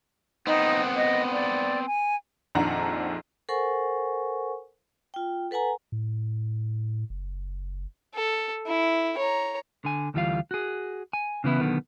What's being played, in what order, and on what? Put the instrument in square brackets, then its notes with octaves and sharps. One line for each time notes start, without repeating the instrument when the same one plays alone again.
[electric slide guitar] B3 C4 [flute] D#4
[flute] D#5
D5
G#5
[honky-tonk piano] A#1 F2 D#3 D4 F#5 A#5
[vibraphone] A4 A#4 C5 F#5 G#5 C#6
F4 G5
A4 B4 F#5 G#5 A#5
[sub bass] A2
F#1
[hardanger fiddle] A4
E4
C#5 A#5
[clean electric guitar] D3 G#5
D2 E3 G3 F4 F5
F#4 G#4
G#5
C#3 E3 B3 E4
B1 B2 D3 D#3 B3